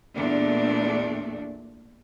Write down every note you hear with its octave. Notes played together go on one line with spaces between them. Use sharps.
E2 A#2 A3 D4